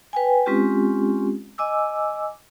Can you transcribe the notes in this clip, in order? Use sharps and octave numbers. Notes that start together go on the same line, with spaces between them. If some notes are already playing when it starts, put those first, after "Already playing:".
B4 G5 G#5
G#3 C4 C#4 F4 G4
D#5 G#5 D6 E6